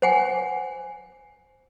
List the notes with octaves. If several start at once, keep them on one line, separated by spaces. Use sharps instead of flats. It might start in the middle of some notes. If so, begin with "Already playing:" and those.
C5 F#5 G#5